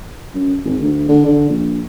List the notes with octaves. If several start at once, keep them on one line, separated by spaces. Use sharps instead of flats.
F#2
G#1
D2
D3
D3
A#1